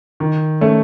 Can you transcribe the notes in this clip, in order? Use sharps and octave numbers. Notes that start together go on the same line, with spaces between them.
D#3
A3 C#4